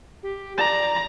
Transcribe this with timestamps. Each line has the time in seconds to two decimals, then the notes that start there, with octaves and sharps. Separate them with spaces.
0.23 G4
0.58 D5 A#5